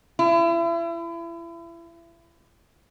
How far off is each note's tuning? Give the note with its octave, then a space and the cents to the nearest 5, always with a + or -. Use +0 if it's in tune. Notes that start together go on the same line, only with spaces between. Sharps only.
E4 +35